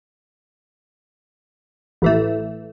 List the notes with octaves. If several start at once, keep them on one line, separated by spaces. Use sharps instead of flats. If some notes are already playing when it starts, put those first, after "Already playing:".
A1 E3 A3